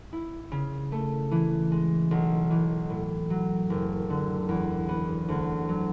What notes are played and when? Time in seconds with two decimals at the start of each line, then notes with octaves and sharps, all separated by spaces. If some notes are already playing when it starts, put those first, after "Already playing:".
0.13 E4
0.52 C#3
0.92 A3
1.31 E3
1.72 G#3
2.11 B1
2.50 E3
2.90 A2
3.30 F#3
3.70 F#1
4.10 D3
4.49 E2
4.89 B3
5.29 D2
5.69 F#3